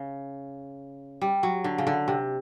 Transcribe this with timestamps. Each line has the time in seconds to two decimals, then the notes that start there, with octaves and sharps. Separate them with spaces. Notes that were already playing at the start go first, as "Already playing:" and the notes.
Already playing: C#3
1.21 G3
1.43 F#3
1.64 D3
1.78 C#3
1.87 D3
2.08 C3